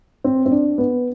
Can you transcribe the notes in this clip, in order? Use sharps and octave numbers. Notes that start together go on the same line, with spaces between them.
C4
C4
D4
B3